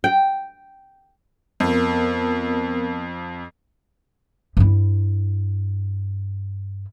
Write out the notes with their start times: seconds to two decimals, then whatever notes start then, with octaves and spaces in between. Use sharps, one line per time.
0.04 G5
1.60 F2 B3 A#4
4.57 G2 E4